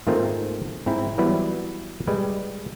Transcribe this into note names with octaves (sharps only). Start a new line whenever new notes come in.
G#2 D#3 A3 A#3 C4 F4
G#2 C4 E4
E3 F#3 G3 B3 E4 B4
G3 G#3 B4